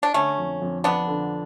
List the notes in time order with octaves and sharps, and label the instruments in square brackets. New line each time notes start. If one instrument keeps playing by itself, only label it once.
[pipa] D4
[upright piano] D3 [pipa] A3 C#4
[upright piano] F2
F2
[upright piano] F3 [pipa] B3 D4
[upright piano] D3